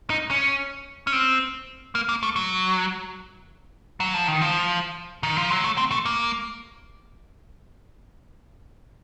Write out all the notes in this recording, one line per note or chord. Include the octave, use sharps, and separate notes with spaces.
D#4
C#4
C#4
C4
A#3
A#3
A3
F#3
F#3
F3
D#3
F3
D#3
F3
F#3
A3
C4
A3
A#3